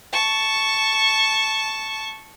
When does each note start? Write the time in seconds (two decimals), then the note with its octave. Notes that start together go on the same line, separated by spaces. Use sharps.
0.12 A5 C#6